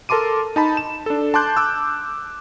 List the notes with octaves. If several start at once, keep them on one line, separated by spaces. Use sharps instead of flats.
A4 A#4 A5 C6 D6 D#7
D#4 A5 B5
E7
D4 A4
A5 C6 D6 F#6 G6
D6 E6